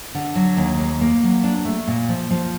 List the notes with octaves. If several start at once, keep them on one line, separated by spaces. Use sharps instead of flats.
D3
F#3
D#2
A#3
A#3
F#3
D4
A3
A#2
F3
F3